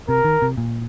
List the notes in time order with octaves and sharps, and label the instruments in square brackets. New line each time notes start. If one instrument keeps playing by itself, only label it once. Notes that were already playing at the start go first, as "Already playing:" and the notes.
[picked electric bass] C3 [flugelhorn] A#4
[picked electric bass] D#3
C3
A#2